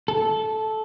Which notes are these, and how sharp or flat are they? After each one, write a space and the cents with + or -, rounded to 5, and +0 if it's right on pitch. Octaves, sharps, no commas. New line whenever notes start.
A4 -15